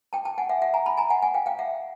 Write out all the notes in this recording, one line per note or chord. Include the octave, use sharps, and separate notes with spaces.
G5 A5
G5 A5
F#5 G#5
E5 F#5
E5 F#5
G#5 A#5
A5 B5
G#5 A#5
F#5 G#5
F#5 G#5
F5 G5
F5 G5
E5 F#5